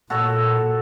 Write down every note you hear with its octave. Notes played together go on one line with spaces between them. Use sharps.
A#2 F#4 A4 C#5